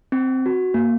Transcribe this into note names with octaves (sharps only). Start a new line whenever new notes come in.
C4
F#4
A#3